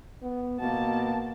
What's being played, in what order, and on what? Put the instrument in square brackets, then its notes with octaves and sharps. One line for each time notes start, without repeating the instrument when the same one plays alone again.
[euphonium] B3
[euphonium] B2 [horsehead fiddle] A#3 A5